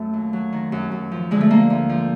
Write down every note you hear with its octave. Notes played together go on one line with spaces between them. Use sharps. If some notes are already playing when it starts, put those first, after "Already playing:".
Already playing: F#2 A3
D#2
F#3
D#3
F#2
F#2
F3
D3 G#3
A3
D2 A#3
D2
F3